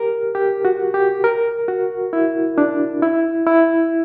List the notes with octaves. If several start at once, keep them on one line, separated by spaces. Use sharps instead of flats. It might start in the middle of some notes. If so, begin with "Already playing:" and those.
Already playing: G4 A#4
G4
F#4
G4
A#4
F#4
E4
D4
E4
E4